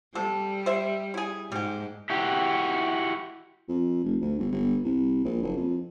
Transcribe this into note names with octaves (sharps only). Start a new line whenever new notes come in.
C3 G3 A4
C5 E5
E4 G#4
G#2 G3 G4
E4 F#4 G4
F2
F1
D2
G1
G1
C2
A#1
F#1
F2